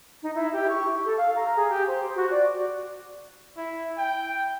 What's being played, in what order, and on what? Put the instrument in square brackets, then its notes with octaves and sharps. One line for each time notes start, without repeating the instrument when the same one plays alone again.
[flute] D#4
E4
G4
C#6
A4
F5
A#5
G#4
G4
C5
F#4
D5
[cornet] E4
G5